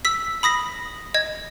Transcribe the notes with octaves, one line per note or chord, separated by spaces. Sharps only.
E6 B6
B5 D#6 A#6 B6
D#5 G#6